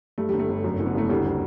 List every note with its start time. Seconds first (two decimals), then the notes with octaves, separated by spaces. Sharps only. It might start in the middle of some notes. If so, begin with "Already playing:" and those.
0.18 G2 A3
0.29 G1 G3
0.39 A3
0.49 G1
0.64 F#2
0.79 F#1
0.86 B3
0.94 F#1 A3
1.10 D2 G3
1.26 G3